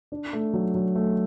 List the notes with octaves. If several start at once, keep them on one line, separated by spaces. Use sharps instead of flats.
D4
A3
F#3
F#3
A3